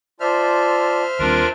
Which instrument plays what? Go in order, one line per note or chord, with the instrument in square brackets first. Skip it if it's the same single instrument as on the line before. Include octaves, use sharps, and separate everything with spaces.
[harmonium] F4 D5 A5 [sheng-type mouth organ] C5 E5 F6
[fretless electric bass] D#2 G3 C4 [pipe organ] D4 F4 A#4